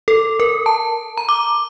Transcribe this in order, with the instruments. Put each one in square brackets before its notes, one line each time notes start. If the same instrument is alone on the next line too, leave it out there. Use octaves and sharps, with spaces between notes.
[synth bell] A4
A#4
A5
A#5
D6